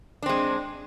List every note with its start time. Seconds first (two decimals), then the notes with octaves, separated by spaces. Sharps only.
0.23 D4
0.26 C4
0.29 G#3